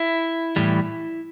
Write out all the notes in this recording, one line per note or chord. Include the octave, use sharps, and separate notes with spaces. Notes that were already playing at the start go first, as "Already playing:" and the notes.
Already playing: E4
A2 E3 G3